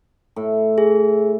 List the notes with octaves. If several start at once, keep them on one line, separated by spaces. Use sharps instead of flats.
A2
G#4